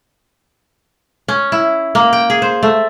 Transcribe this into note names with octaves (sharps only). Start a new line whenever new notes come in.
C#4
E4
A#3
G5
G#4
C5
A3